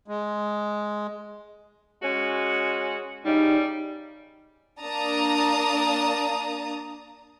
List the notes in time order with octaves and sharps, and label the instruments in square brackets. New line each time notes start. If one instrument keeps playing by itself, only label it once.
[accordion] G#3
[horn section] G#3 C#4 F#4
[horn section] C#3 G3 [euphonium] D#4
[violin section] A#3 D4 A5 A#5 D#6